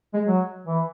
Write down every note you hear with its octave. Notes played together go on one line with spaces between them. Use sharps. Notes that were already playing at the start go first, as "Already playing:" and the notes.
G#3
F#3
E3